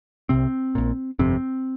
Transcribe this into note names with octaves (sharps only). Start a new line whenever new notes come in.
C2 C3 C4
A#1 A#2
G1 F2 C3 C4